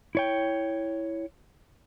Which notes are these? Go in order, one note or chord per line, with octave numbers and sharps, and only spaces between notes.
E4 C#5 G5